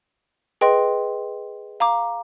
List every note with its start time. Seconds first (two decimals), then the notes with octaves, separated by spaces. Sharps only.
0.61 G#4 B4 D#5 G5 C6
1.80 F5 A#5 D6